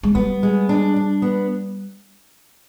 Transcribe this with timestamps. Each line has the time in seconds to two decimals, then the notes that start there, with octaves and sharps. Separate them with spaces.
0.03 G#3
0.15 G3 B3
0.43 G#3
0.69 D4
0.96 D4
1.22 B3